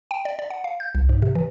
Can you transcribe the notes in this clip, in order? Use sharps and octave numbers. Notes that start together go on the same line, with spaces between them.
G5
D5
D5
F#5
F5
G6
C2
G#2
C3
E3